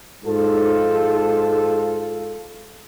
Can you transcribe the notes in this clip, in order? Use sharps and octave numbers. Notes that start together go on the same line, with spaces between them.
G#2 F4 A4